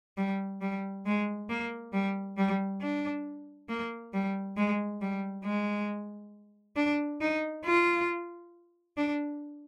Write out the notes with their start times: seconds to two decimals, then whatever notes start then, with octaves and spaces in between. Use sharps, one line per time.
0.17 G3
0.62 G3
1.06 G#3
1.50 A#3
1.93 G3
2.37 G3
2.81 D4
3.69 A#3
4.13 G3
4.57 G#3
5.02 G3
5.45 G#3
6.76 D4
7.21 D#4
7.65 F4
8.97 D4